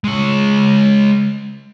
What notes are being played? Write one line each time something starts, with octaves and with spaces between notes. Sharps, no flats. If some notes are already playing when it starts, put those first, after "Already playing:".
G#3 C#5